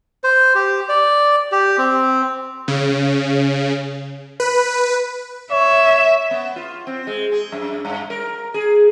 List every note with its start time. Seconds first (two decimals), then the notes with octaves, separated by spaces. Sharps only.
0.24 C5
0.55 G4
0.89 D5
1.52 G4
1.78 C4
2.68 C#3
4.40 B4
5.52 C#5 E5
6.31 B3
6.56 F4
6.87 C4
7.07 G#3
7.32 G#4
7.52 F#2
7.85 G2
8.10 A#4
8.54 G#4